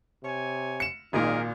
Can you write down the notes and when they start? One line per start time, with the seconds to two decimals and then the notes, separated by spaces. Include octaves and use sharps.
0.23 C3 C#5 G#5
0.80 C#7 E7
1.13 G#1 A#2 D#4 G#4 A#4